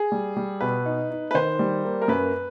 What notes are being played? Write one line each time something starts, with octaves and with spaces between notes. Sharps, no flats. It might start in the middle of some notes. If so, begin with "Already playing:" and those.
Already playing: G#4
G3
G3
B2 B4
D#4
D#4
B4
D#3 C5
G3
A#3
A#4
F#2 B4